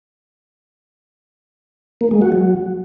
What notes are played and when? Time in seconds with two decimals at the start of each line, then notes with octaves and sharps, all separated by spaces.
2.01 A#3
2.11 G#3
2.22 F#4
2.32 F#3